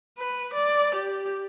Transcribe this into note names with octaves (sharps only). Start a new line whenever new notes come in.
B4
D5
G4